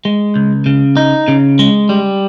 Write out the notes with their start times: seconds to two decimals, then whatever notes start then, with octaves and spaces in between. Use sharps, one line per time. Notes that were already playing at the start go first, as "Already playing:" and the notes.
0.05 G#3
0.36 C#2
0.66 C#3
0.97 D#4
1.28 C#3
1.59 G#3
1.89 G3